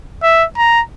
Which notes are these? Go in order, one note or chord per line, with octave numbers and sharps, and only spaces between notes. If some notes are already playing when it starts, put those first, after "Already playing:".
E5
A#5